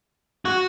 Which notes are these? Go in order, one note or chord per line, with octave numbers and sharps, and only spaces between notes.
F#4